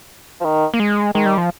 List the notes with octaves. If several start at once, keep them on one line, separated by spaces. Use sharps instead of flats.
F3
D#3
A#3
G#3
D#3 G#3
G3
F3